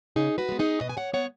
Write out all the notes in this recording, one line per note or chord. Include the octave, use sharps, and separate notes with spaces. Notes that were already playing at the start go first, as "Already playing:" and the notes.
C#3 D#4 G#4
F#4 B4
G#3 B3
D#4 G#4
B2 B4 D#5
G#5
C#5 F#5
B3 C#5 F#5